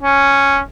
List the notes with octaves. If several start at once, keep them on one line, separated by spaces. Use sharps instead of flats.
C#4